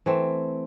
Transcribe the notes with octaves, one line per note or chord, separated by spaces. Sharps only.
E3 A3 C4